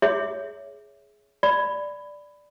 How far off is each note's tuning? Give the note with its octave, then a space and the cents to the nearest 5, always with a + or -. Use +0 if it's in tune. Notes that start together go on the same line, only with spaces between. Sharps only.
G#4 +10 C#5 +10 E5 +0
D5 +0 B5 +15